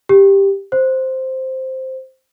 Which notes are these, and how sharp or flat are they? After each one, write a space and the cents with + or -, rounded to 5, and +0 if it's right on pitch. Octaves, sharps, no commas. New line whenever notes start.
G4 +5
C5 +0